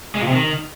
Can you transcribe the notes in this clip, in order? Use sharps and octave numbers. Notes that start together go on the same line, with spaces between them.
G#3
A#2
C3
D#3